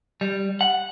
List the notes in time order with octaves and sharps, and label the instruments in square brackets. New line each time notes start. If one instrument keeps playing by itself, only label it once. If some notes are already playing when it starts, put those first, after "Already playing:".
[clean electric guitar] G3
F#5